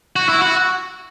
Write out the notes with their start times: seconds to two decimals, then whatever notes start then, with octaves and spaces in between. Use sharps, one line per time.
0.16 F#4
0.29 E4
0.42 F#4